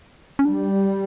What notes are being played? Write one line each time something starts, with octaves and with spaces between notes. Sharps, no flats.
C#4
G3 D4